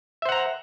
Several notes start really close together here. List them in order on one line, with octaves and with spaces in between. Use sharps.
E5 C5 F#5 A#5